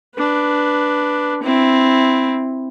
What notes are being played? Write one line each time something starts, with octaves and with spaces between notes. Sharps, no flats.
D4 B4
C4 E4